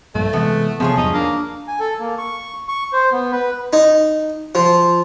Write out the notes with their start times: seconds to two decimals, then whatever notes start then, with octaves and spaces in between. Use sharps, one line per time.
0.15 A#1 G2 A#2 A3
0.33 C3 E3 G#3 B3
0.80 C3 F3 F#3 B3 G#4 C#5
0.97 E2 G2 D#4
1.14 A#3 D4
1.68 G#5
1.80 A4
2.00 A#3
2.18 C#6
2.68 C#6
2.93 C5
3.12 B3
3.32 B4
3.73 D#4
4.55 F3